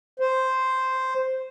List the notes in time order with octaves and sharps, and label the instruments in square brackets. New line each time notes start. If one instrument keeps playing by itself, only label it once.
[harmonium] C5